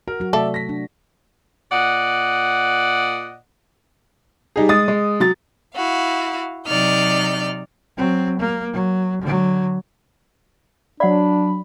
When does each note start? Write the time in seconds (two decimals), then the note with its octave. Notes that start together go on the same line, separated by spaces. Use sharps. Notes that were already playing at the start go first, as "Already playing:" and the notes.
0.08 F#4 A#4
0.20 F#3 F#4
0.33 C3 A3 A4 D5 E5 A5
0.54 A#6 B6
0.69 D4
1.72 A#2 D5 D#5 F#5
4.56 G3 D#4 G#4
4.69 G#3 D#6 A6
4.88 G#3
5.20 F#3 A6
5.75 E4 F#4 F5
6.66 C3 F#3 D#4 D5 F6 G6
7.97 F#3 C4
8.39 A#3
8.73 F#3
9.22 D3 F#3
11.00 F#3 D4 D5 F#5 B5